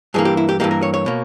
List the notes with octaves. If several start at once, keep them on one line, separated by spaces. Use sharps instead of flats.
G2 E3 A#3 G#4
G4
E4
G4
G2 E3 A#3 G4
A#4
C#5
C#5
B2 A#3